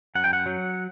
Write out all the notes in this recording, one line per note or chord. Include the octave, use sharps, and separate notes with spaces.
F#2 F#5
G5
F#5
F#3